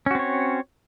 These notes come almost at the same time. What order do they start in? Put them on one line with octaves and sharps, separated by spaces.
C#4 F#4 C4 C#5